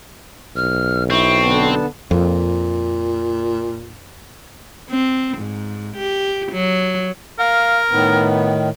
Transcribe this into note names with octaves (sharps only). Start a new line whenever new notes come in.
B1 F6
C4 E4 C#6
D3 B3 A5
F2 A#2
C4
G#2
G4
F#3
A#4 F5
A2 D#3 B3